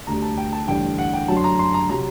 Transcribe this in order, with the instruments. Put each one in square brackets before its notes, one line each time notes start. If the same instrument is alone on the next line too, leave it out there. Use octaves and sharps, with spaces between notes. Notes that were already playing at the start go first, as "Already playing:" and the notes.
[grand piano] D2 D3 G3 A#5
A5
G5
A5
A1 G2 D3 G5
F#5
G5
F#2 D3 F#3 A5
C6
A#5
C6
A#5
C3 F#3 A#5